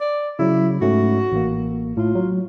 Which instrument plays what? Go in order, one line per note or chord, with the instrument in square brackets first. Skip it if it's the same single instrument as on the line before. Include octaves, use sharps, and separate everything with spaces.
[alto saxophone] D5
[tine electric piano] C#3 F#3 [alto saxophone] E4
[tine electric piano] G#2 A3 C#4 [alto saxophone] F#4
[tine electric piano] A1 A#3
[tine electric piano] A2 [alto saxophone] F4
[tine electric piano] F#3